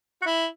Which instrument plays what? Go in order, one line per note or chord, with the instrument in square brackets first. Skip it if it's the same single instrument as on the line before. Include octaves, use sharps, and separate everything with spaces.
[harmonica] F#4
E4